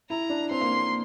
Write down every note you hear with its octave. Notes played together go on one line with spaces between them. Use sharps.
E4 A#5
D4
C4 C6
A#3
A#3